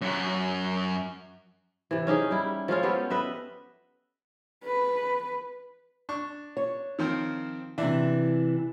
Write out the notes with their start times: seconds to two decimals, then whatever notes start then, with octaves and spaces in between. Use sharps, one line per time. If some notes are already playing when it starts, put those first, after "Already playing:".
0.01 F#2 F#4
1.91 C3 E3
2.07 C#4 D#4 G4 G#4
2.31 G3 E4
2.68 F3 G#3 C#4 F4
2.83 B3 F4 G4 A4
3.10 B4 D#5 E5
4.65 B4
6.09 D4 C#6
6.57 C#5
6.99 D#3 F3 C4
7.78 C3 E3 D4 E5